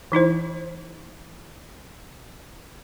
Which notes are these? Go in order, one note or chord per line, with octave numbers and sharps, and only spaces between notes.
E3 D#4 E4 C5